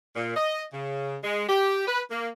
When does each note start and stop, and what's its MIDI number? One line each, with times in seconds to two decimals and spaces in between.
0.16 0.34 46
0.36 0.63 75
0.73 1.17 49
1.23 1.43 56
1.49 1.87 67
1.87 2.02 71
2.11 2.28 58